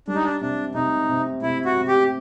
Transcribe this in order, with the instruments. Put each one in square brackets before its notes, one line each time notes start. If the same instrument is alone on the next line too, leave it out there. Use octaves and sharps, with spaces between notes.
[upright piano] G3 [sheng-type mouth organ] D4
[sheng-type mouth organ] D#4
D4
[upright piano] C3 [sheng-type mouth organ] D4
[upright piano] C3 [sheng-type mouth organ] D#4
[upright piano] C3
[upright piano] C3 [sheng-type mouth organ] E4
[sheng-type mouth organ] F#4
[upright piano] C3
[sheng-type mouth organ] G4